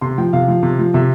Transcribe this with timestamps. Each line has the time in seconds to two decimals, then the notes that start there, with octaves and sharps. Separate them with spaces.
0.01 C3 C6
0.18 F3 G5
0.33 C3 F5
0.48 F3
0.63 C3
0.79 F3
0.94 C3 E5